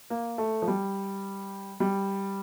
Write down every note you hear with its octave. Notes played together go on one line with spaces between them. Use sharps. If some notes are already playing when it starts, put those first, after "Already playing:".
A#3
A3
F3
G3
G3